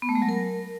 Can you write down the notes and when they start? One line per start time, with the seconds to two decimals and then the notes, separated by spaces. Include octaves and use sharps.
0.02 B3
0.09 A3
0.15 G#3
0.22 F#3
0.29 A#4